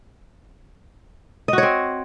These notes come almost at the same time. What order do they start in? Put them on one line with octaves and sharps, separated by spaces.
D#5 F#4 C#5 C4